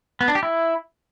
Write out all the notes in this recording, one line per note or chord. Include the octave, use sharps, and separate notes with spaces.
B3
D4
G4
E4